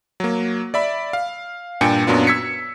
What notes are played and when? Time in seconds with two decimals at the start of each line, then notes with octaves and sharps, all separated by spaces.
0.20 F#3 A#3
0.74 D5 E5 B5
1.13 F5
1.81 G2 A#2 D4 G5 G#5 C#7
2.07 F#2 A#2 F#3 B3 D4 F4
2.27 E6 G#6 B6 C#7